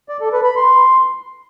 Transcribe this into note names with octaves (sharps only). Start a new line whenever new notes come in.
D5
A4
B4
B5
C6